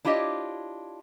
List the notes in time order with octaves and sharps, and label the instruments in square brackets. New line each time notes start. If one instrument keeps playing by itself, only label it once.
[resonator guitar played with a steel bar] D4 E4 F4 G4 C#5 D#5